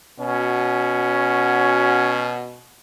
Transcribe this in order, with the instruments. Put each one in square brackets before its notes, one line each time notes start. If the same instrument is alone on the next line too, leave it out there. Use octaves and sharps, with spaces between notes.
[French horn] B2 [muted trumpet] C#4 [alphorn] F#4